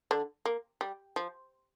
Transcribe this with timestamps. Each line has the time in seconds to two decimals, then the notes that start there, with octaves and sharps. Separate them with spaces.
0.11 D3 D4
0.45 A#3
0.81 G3
1.16 F3